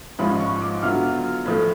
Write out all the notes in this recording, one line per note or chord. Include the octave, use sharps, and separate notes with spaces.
G#2 F3 G#3 C#4 F4 B5
C#6
D6
D3 F#3 B3 F4 F6
A2 F3 A3